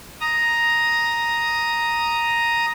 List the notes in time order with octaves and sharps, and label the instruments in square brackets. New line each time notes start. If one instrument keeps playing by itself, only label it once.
[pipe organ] A#5 D#6